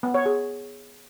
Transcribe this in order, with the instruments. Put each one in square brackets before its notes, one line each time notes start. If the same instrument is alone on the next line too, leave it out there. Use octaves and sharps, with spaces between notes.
[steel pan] B3
C#5
G#4